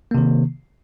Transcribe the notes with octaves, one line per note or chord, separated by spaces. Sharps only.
C3 D#3 A#3